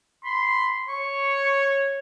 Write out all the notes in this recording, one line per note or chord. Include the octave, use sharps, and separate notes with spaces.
B5 C6
C#5 C#6